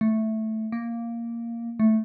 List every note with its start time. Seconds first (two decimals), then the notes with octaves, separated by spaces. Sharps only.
0.01 A3
0.72 A#3
1.80 A3